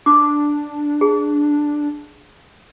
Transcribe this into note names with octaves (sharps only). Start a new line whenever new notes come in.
D4 D6
G#4